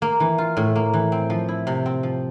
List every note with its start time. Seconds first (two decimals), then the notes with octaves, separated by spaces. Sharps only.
0.02 A#3
0.20 E3
0.38 F4
0.57 A2
0.76 A#3
0.94 E3
1.12 C4
1.30 F3
1.48 E4
1.67 C3
1.86 C4
2.03 F3